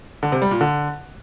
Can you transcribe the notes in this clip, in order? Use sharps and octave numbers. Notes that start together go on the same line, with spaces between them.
D3
C3
G3
A#2
D3